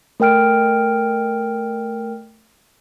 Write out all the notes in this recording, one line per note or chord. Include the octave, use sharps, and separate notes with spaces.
A3 A#4 G5 F6 D7